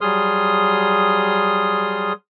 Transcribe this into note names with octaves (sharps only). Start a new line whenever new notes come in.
F#3 G3 G#4 C6 D#6 F6